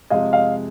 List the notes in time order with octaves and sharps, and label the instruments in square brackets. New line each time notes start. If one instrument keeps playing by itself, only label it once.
[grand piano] F2 C3 F3 G#3 [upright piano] D#5 F5
[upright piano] D#5 F5